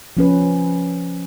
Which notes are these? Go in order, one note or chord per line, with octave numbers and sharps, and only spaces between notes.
F3 C#4 B4